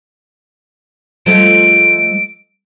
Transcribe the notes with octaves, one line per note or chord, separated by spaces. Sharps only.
F3 G#3 A3 D7